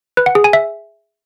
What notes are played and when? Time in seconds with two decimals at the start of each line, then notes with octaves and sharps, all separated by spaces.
0.17 B4
0.26 F#5
0.35 G#4
0.44 G#5
0.53 E5